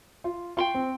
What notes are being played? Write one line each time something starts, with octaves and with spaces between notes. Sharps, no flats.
F4
F4 G5 C6 C#6
C4